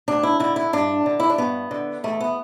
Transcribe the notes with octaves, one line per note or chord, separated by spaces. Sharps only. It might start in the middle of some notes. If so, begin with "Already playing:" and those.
D2 D4
E4
D3 E4
E4
G2 D4
D3
E4
D4
G2 B3
D3
E2 A3
B3